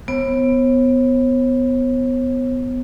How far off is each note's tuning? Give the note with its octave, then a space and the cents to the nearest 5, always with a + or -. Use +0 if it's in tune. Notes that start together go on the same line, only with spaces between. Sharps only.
B3 +15 C#5 -45